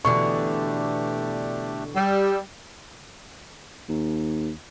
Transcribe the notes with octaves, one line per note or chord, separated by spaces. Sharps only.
B2 D3 E3 A3 D4 G4 C#6
G3 E6
D#2